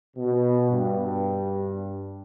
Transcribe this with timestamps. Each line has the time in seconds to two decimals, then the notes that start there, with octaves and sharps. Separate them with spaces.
0.17 B2
0.71 G2